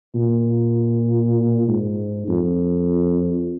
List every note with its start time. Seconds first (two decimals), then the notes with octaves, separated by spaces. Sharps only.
0.15 A#2
1.68 G#2
2.28 F2